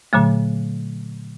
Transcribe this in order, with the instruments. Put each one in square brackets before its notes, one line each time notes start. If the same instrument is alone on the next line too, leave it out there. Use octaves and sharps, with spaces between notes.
[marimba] A#2 D3 F#3 A3